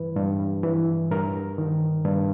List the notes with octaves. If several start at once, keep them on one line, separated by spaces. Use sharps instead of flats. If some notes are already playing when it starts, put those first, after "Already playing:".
Already playing: G2 E3 B4
G2
E3
G2 A#4
D#3
G2